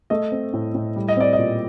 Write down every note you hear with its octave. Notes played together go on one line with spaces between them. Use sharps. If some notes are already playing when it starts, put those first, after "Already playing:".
A3 D#5
C4
A2
A2
G3
D#5
C4 D5
D#5
A#2